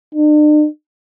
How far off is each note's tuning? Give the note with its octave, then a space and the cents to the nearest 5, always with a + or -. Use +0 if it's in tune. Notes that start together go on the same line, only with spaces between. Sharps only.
D4 +45